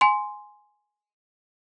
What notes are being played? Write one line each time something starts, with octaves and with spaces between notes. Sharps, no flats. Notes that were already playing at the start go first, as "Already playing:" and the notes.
G#5 C6